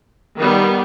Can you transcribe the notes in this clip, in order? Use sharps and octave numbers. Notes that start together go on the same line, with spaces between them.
D#3 G3 B3